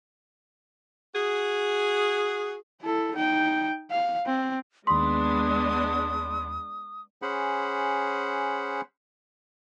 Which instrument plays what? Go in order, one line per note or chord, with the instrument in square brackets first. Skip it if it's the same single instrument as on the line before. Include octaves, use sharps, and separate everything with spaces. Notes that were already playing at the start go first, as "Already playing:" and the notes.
[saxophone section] F#4 G#4
[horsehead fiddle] E4 A4
D#4 G5
F5
C4
[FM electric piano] D#2 B5 [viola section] G#3 B3 D4 [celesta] C6 [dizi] D#6
[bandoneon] C#4 G#4 C5 F#5 B5